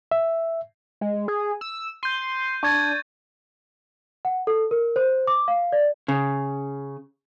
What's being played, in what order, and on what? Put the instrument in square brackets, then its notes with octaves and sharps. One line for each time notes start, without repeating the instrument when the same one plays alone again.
[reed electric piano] E5
[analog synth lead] G#3
G#4
E6
[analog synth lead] C6 [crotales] G6 D#7
[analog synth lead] D4 [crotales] C#6 G#6 A6
[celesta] F#5
A4
A#4
C5
D6
F5
D5
[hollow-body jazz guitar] C#3